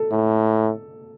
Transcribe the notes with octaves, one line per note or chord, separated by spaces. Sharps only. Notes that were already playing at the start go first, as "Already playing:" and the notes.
Already playing: A4
A2